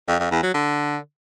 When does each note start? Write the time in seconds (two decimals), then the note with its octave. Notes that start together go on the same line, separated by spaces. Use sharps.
0.08 F2
0.20 F2
0.31 E2
0.43 F#3
0.54 D3